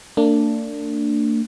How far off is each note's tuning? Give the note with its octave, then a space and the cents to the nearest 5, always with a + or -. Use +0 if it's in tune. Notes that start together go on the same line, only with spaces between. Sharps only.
A#3 -45 D4 -5